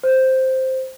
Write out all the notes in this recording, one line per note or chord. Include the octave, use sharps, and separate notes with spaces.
C5